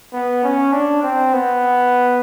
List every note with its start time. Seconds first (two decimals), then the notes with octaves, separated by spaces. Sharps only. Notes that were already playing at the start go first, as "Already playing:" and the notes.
0.13 B3
0.44 C#4
0.73 D4
1.03 C4
1.33 B3